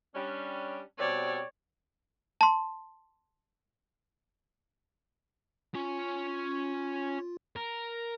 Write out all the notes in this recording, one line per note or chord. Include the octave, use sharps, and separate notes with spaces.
G3 C#4 D4
B2 G3 C4 C#5 D5
A5 C6
C#4 F4 C#5
A#4